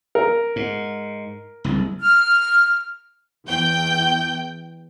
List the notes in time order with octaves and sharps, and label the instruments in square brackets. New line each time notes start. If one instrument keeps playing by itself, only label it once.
[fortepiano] A#4
[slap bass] G#2
F#1 C2
[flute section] F6
[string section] E2 G5 G6